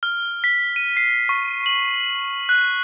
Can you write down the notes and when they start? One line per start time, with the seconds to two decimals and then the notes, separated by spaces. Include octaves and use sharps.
0.03 F6
0.44 B6
0.76 D#7
0.97 C7
1.29 C#6
1.66 F#7
2.49 F#6